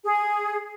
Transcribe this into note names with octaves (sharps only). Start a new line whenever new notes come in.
G#4